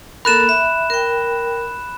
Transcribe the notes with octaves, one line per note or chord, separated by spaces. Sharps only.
A#3 A4 A#4 B5 F#6 E7
E5
A#4 G5